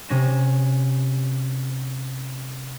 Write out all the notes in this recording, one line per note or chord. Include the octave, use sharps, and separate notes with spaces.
C3 C#4 A#6 E7